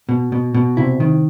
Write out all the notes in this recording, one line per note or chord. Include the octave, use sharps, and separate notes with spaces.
B2
B2
B2
C3 E4
D#3